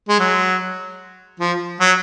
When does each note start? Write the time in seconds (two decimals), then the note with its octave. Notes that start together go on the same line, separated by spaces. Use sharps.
0.09 G#3
0.19 F#3
1.40 F3
1.80 F#3